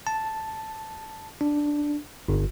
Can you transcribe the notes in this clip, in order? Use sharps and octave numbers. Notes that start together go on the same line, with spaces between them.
A5
D4
G1